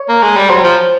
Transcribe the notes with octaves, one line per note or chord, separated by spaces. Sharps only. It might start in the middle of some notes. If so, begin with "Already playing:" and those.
Already playing: C#5
A#3
G#3
G3
F#3 C5
F3